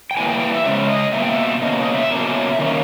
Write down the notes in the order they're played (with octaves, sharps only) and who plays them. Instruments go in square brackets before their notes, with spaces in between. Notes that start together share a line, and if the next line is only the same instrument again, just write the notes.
[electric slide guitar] G5
E3 G3 A#3 G#5
G5
G5
E5
C#3 G#3 C#4 E5
D#5
B2 A#3 E5
G5
E5
B2 A#3 C#4 D#5
D#5
E5
B2 A#3 C#4
D#3 A#3 C#4